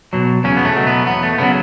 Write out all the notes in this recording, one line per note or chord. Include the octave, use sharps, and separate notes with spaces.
B2 F#3
E2 C#3 C#4
B3
A3
B2 F#3
B3
E2 B3
A3
C#3 F#3 B3